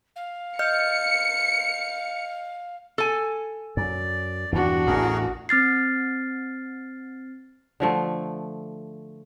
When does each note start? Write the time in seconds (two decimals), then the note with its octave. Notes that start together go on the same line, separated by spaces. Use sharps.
0.16 F5
0.59 D#5 F6 G6 C#7
2.98 A4 G#5
3.77 F#2 D5
4.52 E2 G2 A#2 D4 F#4
4.87 A1 E2 A2 G#4 A#4
5.49 C4 F6 A6 C7
7.80 D3 F3 A3